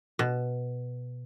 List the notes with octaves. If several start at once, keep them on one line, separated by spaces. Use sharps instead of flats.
B2